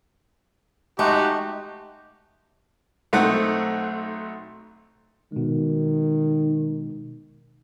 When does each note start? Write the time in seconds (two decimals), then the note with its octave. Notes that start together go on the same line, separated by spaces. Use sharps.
0.99 G#3 A3 D#4 F#4 G4
3.13 B1 A3 C4 D#4 F#5
5.32 B2 D#3 G#3